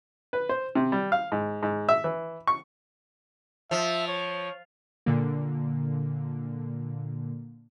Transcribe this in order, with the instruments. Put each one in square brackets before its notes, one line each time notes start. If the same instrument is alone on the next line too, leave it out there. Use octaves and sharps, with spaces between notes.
[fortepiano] B4
C5
C3
G3
F5
G#2
G#2
E5
E3
C#6
[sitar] F3 [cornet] E5
[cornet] C#5
[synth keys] A#2 D3 A#3